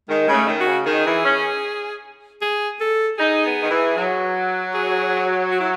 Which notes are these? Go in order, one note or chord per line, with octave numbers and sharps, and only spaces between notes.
D#3 G#3
C#3 G#3
A3
D#3
F#4
C#3
D#3 G#4
E3
C#4
G#4
A4
D#4 G#4
B3
D#3
E3
F#3
G#4
F#4
E4